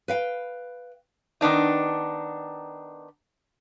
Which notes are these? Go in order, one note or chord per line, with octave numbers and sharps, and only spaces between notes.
B4 F5 G5
D#3 B3 D4 D#4